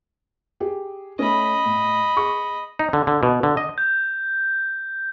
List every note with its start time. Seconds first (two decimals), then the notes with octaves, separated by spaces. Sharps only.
0.60 G4 G#4
1.19 A3 C#4 D#5 B5
1.66 A2
2.16 G#4 C#6
2.79 D#4
2.93 D3
3.07 D3
3.23 B2
3.43 D3
3.57 D#5
3.78 G6